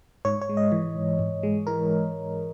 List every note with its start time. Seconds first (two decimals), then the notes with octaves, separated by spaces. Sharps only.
0.25 G#2 C#5
0.41 C#5
0.49 G#3
0.57 D#5
0.72 E3
0.96 G#2
1.19 G#2
1.43 G#3
1.67 E3 A#4